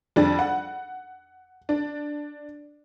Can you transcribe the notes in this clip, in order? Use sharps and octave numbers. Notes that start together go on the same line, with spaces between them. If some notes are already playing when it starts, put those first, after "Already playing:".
F2 G3 D4
F#5
D4